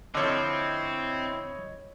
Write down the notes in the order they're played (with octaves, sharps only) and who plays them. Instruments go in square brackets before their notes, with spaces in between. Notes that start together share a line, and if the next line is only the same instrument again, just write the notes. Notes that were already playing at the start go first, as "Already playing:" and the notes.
[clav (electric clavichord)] D3 F3 A4 [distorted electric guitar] C4 [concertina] E4 [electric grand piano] C#5 D#5